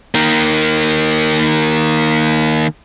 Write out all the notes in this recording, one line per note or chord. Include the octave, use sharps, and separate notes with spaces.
D#3 A#3